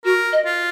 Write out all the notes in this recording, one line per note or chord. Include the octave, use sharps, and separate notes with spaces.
F#4 A#4
D#5
F4